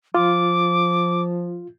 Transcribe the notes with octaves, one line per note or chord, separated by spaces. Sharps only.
F3 F4 D6